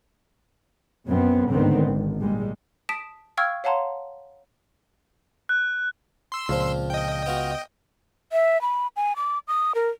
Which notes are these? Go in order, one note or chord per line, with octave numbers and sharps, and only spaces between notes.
F#2 B3 C4
D2 G#2 D3 D#3 B3 C4
G#1
A#2 G3 G#3
A5 D#6 B6 D7 E7
F5 G5 C#6 E6 F6 G#6
C#5 F5 F#5 A5 A#5 C6
F#6
C6 E6
C#2 A#2 F3 C4
D#5 G5
B3 F4 F#4
E5
B5
G#5
D6
D#6
A#4